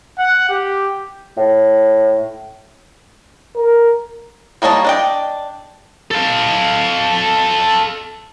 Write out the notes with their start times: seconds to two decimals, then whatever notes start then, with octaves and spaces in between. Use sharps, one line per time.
0.18 F#5
0.50 G4
1.37 A2
3.56 A#4
4.62 G3 A#3 C#5 D#5 A5
4.85 D4 D#5 G5
6.11 A4 F5